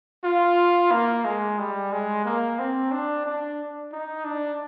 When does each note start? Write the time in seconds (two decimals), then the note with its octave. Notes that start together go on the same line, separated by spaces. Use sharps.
0.24 F4
0.92 A#3
1.25 G#3
1.59 G3
1.92 G#3
2.25 A#3
2.59 C4
2.92 D4
3.25 D4
3.92 D#4
4.25 D4